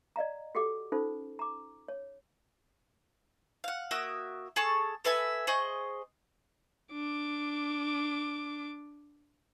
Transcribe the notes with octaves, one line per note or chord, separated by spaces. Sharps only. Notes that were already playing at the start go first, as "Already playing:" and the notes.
D5 D#5 F5 A#5
F#4 G4 A4 F#5 D6
C#4 D#4 F4 A4 C5
A#5 D6
C#5
F5 F#5
A#3 F#4 E5 D#6
G#4 A4 A5 C#6
A4 B4 E5 G#5
G#4 C5 D#5 C#6
D4 D6